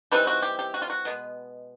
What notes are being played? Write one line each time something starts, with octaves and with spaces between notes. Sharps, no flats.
E3 G3 C4 D#4 B4
F#4
G4
G4
F#4
F4
F#4
B2 G#3 B3